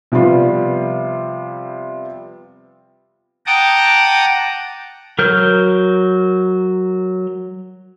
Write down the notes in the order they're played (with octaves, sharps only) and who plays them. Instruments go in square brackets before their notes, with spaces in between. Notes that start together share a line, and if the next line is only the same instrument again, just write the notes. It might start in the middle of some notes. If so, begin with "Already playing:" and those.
[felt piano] C3 F3 G3 B3 F4
[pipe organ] F#5 G5 A5 A#5 D6 D#6
[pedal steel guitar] F#3 A#4 F6 G6